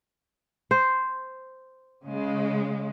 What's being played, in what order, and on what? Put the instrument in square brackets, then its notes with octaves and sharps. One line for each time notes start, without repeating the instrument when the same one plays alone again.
[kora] C5
[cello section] C#3 G#3